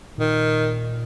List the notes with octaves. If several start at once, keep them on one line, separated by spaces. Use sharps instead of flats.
A#2 D#3